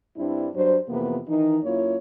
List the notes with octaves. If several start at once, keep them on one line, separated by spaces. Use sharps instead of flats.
G2 G3 C4 D4 E4
G2 F#3 D4 C5
F2 C3 E3 A#3 B3
D#3 E3 D#4
F#2 A#3 E4 F4 C#5